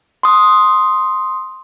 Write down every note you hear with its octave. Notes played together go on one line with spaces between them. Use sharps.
C6 D#6